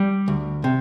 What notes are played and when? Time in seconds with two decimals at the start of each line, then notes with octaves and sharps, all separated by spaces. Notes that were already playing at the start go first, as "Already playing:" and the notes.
Already playing: G3
0.28 D2
0.64 C3